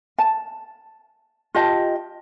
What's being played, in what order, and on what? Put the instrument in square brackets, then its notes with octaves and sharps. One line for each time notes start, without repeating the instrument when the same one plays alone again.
[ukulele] A5
F4 G4 D#5 A5